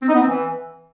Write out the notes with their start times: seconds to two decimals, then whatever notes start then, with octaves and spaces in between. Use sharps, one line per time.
0.02 C4
0.09 D#4
0.15 B3
0.21 C4
0.28 E3